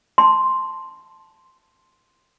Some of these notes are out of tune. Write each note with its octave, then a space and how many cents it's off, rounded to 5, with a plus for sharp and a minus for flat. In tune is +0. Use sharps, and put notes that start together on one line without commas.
A5 +0 C6 +0